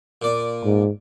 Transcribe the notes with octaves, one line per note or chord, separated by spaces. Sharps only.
A#2 D5
G#2